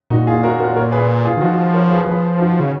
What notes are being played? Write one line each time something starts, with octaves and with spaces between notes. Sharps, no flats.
A#2 D#4 F#4
F4 G#4
F#4 A#4
F#4 A#4
A#4 C#5
G#4 B4
F4 G#4
D#3
F3 D#4 F#4
A#4 C#5
G#4 B4
F3 G#4 B4
D#4 F#4
C#3